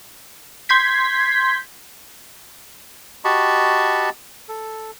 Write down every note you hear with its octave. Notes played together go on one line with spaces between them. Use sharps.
C6 G6 G#6 B6
F#4 G4 D#5 A5 B5 C#6
A4